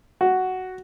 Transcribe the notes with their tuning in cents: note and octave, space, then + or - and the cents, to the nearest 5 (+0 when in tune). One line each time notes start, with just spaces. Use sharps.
F#4 +5